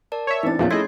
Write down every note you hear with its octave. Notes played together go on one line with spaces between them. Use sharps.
A#4 D5 A5
C#5 E5
E3 C4 D4 D#4 A6
E2 A#2 F3 C#4 D4 C#5
A3 E4 G#4 D#5 C6 G#6 C7